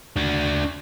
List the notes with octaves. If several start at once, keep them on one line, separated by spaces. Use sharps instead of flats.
D4 F#4